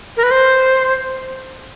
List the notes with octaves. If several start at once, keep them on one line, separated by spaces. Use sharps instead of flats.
A#4
B4
C5